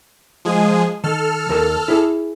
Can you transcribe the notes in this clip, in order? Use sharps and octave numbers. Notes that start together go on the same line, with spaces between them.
F3 G#3 G#4
D#3 A4 F6
D#2 A#4 A5
E4 G#4